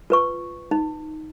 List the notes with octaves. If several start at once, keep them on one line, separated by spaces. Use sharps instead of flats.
F4 B4 C#6
D#4